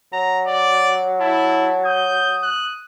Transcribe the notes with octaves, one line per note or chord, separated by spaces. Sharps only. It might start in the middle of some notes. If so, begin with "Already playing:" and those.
F#3 A#5
D5
E4 A5
D#6 G6
F#6